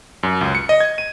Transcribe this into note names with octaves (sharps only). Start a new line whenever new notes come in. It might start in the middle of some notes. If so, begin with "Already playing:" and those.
F#2
C#2
C#7
D#5
G#6
D#7